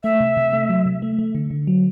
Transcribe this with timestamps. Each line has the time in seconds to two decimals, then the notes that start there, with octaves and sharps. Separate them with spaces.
0.04 A3 E5
0.20 C3
0.37 C3
0.53 A3
0.69 F#3
0.86 C3
1.02 A3
1.19 A3
1.35 D3
1.50 D3
1.67 F#3